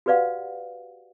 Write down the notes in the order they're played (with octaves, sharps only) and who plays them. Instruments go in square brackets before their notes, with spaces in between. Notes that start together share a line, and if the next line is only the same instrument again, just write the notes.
[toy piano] F#4 G4 B4 D5 F5 F#5